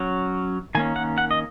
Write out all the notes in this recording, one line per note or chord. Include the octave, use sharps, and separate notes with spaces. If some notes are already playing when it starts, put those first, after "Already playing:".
Already playing: F#3 C#4
D#3 A#3 C#4 G#5
F#5
F#5
D#5